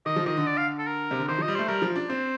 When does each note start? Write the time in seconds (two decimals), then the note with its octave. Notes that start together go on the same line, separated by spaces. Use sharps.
0.06 D#3 D#5
0.16 F3
0.26 D#3 D#5
0.37 D3
0.47 D5
0.57 F5
0.78 A4
0.87 A#4
1.11 C3
1.19 D3
1.28 D#3 C5
1.38 F3 D#5
1.48 G3
1.55 A3 C5
1.68 G3 A#4
1.82 F3
1.96 D4
2.09 C4 C5